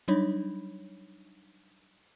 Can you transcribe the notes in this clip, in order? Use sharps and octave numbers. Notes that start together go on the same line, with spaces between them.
F#3 G3 D4 D#4 C#5 B5